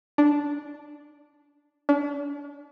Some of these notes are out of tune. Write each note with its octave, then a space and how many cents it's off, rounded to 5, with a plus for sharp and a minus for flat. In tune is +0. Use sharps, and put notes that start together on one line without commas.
D4 -5
D4 -40